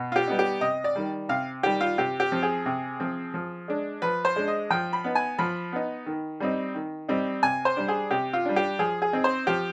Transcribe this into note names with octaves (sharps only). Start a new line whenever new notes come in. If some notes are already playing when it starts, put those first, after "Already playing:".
Already playing: B2
F4
G4
G3 B3 D#4
G4
C3 D#5
D5
D#3 G3
C3 F5
D#3 G3 G4
F4
C3 G4
G4
F3 C4
G#4
C3
F3 C4
F3
G#3 D4
F3 B4
C5
G#3 D4
D#5
F3 G5
B5
B3 D#4
G#5
F3 B5
B3 D#4
D#3
G3 C4 D#4
D#3
G3 C4 D#4
C3 G#5
C5
G3 D4
G#4
C3 G4
F4
G3 D4
G4
F3 G#4
G#4
C4 D#4
C5
F3 G4